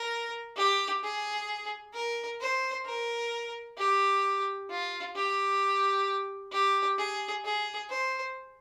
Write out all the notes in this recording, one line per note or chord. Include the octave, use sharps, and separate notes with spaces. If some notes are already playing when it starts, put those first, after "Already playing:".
Already playing: A#4
G4
G#4
A#4
C5
A#4
G4
F4
G4
G4
G#4
G#4
C5